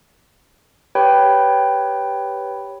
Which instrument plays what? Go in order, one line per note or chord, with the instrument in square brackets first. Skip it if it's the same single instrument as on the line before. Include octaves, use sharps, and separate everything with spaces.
[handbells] G4 B4 C#5 G5 B5